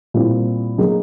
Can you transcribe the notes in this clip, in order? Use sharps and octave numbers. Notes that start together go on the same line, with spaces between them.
A#2 G3 C4 E4
D3 F#3 A#3 D#4 G#4